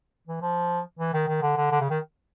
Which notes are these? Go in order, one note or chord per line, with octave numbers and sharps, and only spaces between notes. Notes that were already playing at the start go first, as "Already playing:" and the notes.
E3
F3
E3
D#3
D#3
D3
D3
D3
C#3
D#3